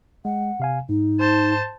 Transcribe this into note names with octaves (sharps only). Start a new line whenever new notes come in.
G#3 F#5
C3 F5 G#5
G#2 D#4
C5 A5